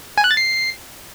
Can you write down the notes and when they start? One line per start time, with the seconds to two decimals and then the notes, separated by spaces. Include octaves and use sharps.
0.18 G#5
0.24 F#6
0.31 A6
0.37 C7